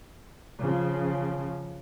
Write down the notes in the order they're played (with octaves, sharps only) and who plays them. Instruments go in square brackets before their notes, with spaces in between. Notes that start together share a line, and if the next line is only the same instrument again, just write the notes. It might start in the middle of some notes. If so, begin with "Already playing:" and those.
[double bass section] C#3 F3